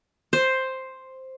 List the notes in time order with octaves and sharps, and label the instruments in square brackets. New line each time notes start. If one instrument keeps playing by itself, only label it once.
[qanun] C5